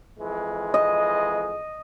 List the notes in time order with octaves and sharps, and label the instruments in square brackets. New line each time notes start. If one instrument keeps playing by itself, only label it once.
[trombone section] F2 E3 G#3
[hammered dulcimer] D#5